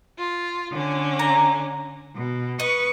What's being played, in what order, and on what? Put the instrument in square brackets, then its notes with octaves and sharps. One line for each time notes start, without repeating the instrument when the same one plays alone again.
[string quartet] F4
D3 C#4
[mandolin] A#5
[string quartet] B2
[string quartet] B4 C#6 [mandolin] D#5